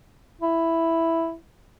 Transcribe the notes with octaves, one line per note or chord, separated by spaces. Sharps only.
E4